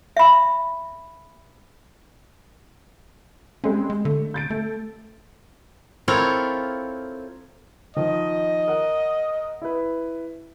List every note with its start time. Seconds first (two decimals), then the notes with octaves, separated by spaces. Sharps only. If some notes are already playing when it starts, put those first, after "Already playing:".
0.17 E5 B5
3.64 G3 G#3 C4 C#4
3.90 G#3
4.05 D3 A3
4.34 G6 A6 D7
4.50 A3 A4
6.08 C4 E4 F4 A4 A#4 C#5
7.96 D#3 F3 D#5
8.68 A#4 F#5
9.62 E4 B4